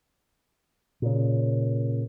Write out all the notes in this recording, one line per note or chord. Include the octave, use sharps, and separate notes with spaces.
A#2 C#3